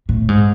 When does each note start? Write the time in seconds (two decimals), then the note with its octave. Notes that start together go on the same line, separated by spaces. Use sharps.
0.09 A2
0.28 G#2